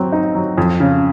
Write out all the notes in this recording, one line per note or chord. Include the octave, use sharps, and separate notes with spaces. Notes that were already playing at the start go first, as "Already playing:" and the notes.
Already playing: F#3 C4
D#4
F#3
F2
C#3